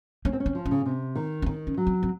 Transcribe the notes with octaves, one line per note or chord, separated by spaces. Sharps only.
A#3 C#4
C4
C#4
C4
F3
C#4
C#3
C3
D#3
C#4
D#3 C4
C#4
F#3
C4
C4